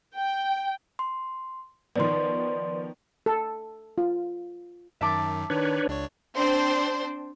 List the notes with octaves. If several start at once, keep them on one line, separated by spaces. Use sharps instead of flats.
G5
C6
D#3 F3 B3 D5 C6
A4
F4
F#2 D#3 E5 A5 D6
D#3 D4 B4 C#5
C#2 D4 C#5
C4 D4 C5